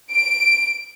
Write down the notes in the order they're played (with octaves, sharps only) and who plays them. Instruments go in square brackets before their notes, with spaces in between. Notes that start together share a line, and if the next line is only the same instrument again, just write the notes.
[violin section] D7